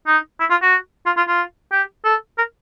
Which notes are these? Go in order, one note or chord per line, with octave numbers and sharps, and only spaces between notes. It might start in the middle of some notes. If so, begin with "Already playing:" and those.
D#4
E4
F4
F#4
F4
F4
F4
G4
A4
A#4